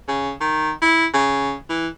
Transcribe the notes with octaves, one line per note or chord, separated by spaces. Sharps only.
C#3
D#3
E4
C#3
E3